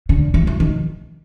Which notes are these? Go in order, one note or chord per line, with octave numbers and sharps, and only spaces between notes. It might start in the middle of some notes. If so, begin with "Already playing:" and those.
D3
E3
E3
D#3